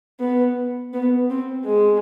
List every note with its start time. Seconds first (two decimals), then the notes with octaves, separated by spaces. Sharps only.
0.20 B3
0.93 B3
1.30 C4
1.65 G#3